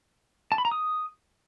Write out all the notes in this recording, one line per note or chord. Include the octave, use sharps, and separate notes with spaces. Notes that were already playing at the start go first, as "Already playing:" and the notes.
A5
B5
A#5
D#6